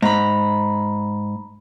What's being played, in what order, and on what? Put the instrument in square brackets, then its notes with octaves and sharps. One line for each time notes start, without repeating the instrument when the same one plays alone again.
[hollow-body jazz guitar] G#2 [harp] A#5 B5